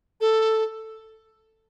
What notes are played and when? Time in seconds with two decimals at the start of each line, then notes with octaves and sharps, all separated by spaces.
0.21 A4